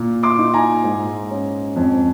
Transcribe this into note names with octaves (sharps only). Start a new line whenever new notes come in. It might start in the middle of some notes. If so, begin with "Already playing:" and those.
Already playing: A#2
C6 D6
D#4
G#5 A#5
G#2
C#4
F2